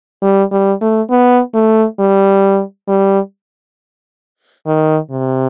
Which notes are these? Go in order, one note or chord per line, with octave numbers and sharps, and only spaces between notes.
G3
G3
A3
B3
A3
G3
G3
D#3
C3